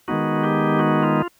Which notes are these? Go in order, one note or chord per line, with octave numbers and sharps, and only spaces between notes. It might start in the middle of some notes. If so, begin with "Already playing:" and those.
D#3 G#3 B3 D#4 F#4
G4
F#4
F4